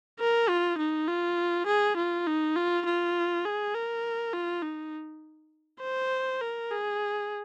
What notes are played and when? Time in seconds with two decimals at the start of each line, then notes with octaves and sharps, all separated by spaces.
0.20 A#4
0.49 F4
0.78 D#4
1.08 F4
1.67 G#4
1.97 F4
2.27 D#4
2.56 F4
2.86 F4
3.45 G#4
3.75 A#4
4.33 F4
4.63 D#4
5.82 C5
6.41 A#4
6.71 G#4